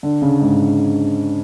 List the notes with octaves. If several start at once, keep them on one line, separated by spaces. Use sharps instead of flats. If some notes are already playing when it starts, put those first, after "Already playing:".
D3
C#3
G#2